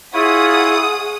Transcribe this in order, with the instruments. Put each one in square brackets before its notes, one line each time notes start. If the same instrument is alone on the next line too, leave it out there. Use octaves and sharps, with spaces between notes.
[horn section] E4 F4 [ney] G#4 [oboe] C#5 [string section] F#5 D#6